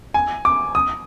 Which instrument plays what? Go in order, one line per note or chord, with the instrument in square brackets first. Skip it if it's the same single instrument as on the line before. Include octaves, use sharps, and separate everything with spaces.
[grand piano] G#5
D6
D#6